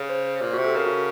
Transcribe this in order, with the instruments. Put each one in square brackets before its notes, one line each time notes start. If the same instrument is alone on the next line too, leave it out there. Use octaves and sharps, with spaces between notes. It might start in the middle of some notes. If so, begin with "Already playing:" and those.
Already playing: [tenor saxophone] C#3
[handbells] C5
[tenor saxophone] A#2
[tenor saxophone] C3 [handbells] F#4
[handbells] A4
[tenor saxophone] C#3 [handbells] A#4
[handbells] F#4